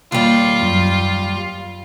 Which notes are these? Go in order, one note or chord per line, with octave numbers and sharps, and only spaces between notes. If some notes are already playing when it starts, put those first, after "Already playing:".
D#2 G3 F4
F#2